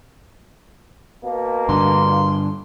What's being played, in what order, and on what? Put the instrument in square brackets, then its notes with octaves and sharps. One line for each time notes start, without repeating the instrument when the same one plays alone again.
[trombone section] B2 A#3
[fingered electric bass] G2 D3 [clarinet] C6